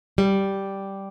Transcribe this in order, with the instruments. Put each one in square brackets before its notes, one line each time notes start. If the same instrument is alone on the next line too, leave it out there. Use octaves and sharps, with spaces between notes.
[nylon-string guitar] G3